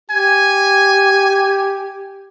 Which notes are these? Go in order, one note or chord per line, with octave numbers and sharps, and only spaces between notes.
G4 G#5